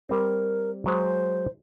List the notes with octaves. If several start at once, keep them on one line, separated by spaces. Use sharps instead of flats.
G3 C4 A#4
F#3 G#3 C5